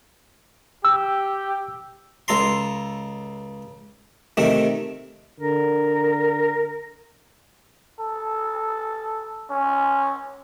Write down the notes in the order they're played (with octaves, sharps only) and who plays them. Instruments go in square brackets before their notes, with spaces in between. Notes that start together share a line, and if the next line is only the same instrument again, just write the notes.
[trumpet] G4 [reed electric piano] E6
[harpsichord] C#2 A4 A#5 C6
C3 D#3 A3
[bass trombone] D3 [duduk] A#4
[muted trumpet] A4
C#4